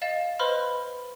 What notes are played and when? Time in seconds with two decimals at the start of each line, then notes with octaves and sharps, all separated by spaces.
0.02 D#5 F5 A6 E7
0.39 B4 C5 D#5 B5 C6 F6